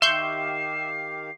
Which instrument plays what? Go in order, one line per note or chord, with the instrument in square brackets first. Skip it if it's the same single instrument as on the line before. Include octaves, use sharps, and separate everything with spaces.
[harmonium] D#3 G4 F5 [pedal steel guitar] E5 [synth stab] C6 C#6 G6 [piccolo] C7